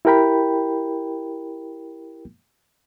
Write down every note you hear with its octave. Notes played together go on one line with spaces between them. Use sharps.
E4 G4 A#4 G5 B5